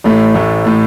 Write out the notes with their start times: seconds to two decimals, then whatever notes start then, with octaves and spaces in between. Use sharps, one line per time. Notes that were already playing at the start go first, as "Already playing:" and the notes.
0.04 A1 A2 A3
0.34 A1 A2 A3
0.65 A2 A3